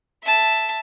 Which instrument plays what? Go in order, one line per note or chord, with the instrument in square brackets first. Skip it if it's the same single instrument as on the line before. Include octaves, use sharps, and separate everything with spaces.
[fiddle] E5 A5